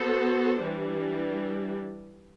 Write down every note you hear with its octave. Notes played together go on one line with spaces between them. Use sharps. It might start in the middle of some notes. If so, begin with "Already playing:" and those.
Already playing: B3 F#4 A4 C5
E3 G3 D4